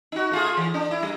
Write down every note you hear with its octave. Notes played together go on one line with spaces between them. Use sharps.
D#4 F#4
A3 F4 G#4
E3
D4
E4
G3